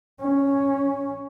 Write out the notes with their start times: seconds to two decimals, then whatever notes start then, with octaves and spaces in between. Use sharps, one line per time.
0.21 C#4